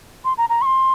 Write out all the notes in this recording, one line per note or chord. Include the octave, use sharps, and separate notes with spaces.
C6
A#5
A#5
C#6
C6